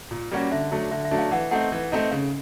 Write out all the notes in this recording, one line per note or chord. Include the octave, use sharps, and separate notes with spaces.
A#2
G3 A#3 C#4 F#4
D3 E5
F#3 A3 D4
D3 E5
E5
F#3 A3 D4
F5
E3 F#5
A3 C4 D#4 F#5
E3
A3 C4 D#4
C#3 F5